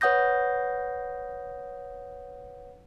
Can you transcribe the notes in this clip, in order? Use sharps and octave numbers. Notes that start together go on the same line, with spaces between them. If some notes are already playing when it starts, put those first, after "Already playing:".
B4 C#5 F#5 D#6 G6 A#6